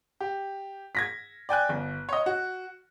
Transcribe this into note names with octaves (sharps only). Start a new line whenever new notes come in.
G4
G#6 A#6 B6
D5 G5 G#5 F#6
G1
C#5 D#5
F#4